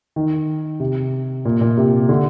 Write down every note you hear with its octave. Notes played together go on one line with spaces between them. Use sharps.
D#3
C3
A#2
A#2
C3
D3